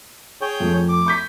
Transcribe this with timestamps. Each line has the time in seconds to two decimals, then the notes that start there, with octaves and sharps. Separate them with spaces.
0.41 G#4 C#5 G5
0.60 F2 A3
0.89 D6
1.06 C#6 G6 B6